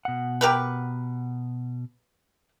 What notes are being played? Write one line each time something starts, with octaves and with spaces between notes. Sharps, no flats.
B2 F#5
G4 A#4 B4